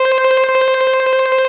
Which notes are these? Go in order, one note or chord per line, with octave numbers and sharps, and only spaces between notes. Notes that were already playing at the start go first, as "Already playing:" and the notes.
Already playing: C5
C5